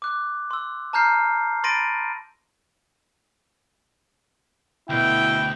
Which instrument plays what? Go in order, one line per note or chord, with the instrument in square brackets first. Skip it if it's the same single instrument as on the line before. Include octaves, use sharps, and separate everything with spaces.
[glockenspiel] D6 F#6
C6 E6
A5 A#5 F6 G6 C7
B5 C6 A6 A#6 D7 D#7
[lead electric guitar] D2 [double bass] B2 [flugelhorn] E4 [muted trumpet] G5